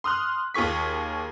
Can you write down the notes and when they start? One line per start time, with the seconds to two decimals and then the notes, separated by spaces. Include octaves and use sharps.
0.04 C6 D#6 F6 F#6
0.54 D#2 F4 G#4 C#6 B6